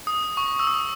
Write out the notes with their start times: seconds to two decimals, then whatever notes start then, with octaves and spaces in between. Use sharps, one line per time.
0.07 D#6
0.37 C#6
0.60 E6
0.67 D#6